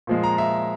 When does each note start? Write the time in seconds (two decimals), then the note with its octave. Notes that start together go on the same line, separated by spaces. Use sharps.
0.07 A#2 F3 G#3
0.23 A#5
0.38 E5